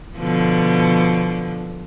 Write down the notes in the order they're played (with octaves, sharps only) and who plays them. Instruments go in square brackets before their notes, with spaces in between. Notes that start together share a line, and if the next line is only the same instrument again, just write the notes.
[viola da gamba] B2 D3 F3